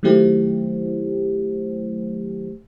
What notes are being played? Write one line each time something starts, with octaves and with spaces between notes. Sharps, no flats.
D#3 F#3 A3 E4 G4 C5